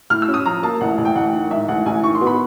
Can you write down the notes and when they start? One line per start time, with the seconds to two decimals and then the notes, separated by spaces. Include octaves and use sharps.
0.10 A2 F6
0.22 E6
0.28 C#4
0.34 D#6
0.46 F3 A#5
0.63 A#3 A5
0.81 A1 F#5
0.98 A1
1.05 G5
1.15 A1 F#5
1.33 D#3
1.51 G#2 E5
1.68 A1 F#5
1.86 A1 G#5
2.04 D#3 C#6
2.15 C6
2.21 B3
2.27 B5